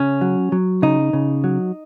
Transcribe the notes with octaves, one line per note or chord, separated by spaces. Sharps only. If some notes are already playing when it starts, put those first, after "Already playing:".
Already playing: C#3 C#4
F#3
F#3
C#3 D#4
C#3
F#3